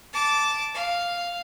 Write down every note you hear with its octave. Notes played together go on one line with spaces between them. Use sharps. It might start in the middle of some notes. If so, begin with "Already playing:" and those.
A5 D6
F5